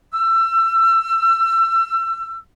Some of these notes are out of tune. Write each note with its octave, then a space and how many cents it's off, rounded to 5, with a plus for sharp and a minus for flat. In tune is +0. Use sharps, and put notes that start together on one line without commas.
E6 +30